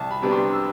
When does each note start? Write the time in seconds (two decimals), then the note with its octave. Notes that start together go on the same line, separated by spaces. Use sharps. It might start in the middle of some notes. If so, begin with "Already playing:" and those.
Already playing: C2 A5
0.11 B5
0.22 C3 G3 B3 D4
0.32 C6
0.53 E6